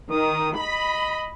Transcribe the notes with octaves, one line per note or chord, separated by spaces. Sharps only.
D#3 D#6
D#5 B5